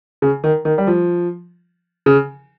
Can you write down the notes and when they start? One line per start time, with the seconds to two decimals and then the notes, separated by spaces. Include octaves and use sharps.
0.22 C#3
0.44 D#3
0.65 D#3
0.78 G3
0.87 F3
2.06 C#3